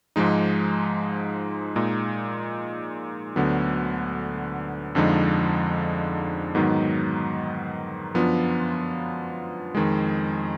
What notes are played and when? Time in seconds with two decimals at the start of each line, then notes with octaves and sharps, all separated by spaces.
0.16 G#2 F3 G#3 D#4
1.76 A#2 G#3 D#4
3.36 D2 D3 F#3 B3
4.95 F2 D3 F3 G#3 D#4
6.55 G#2 D#3 F#3 B3 D#4
8.14 F#2 F3 B3 D4 F4
9.75 F2 D#3 G#3